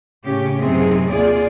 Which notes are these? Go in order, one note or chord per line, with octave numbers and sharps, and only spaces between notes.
A2 C#3 C#4 G4
F#2 C3 B3 C4 D#4 G#4
D#2 C3 F4 G#4 D5